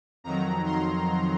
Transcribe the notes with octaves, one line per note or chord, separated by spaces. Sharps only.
F2 D#3 F#3 A#5
C6